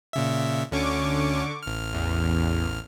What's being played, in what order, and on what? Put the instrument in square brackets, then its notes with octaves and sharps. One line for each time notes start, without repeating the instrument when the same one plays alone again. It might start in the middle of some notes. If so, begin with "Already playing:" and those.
[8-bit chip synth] A#2 C#3 E5
[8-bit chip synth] D2 C#4 [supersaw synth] D3 C#6 D6
[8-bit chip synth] A1 F6
[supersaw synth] E2